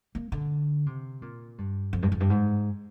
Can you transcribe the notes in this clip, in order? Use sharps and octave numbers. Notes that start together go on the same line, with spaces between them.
A#3
D3
C3
A#2
G2
F2
G2
F2
G2
G#2